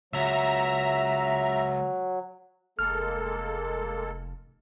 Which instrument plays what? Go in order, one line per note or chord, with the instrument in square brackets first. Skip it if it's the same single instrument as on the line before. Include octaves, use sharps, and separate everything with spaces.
[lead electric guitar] C#2 [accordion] F#3 [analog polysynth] E5 A#5
[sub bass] F1 [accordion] G#3 A#3 A4 [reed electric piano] F6